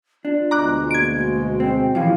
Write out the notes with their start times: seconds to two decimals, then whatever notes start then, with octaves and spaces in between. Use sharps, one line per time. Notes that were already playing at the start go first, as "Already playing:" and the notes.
0.25 D4 F4
0.51 D2 B2 G#3 A#5 D6 F#6
0.91 A#3 G#6 D7
1.60 C4 G5
1.95 A#2 E3 F3 C#4 G4 F5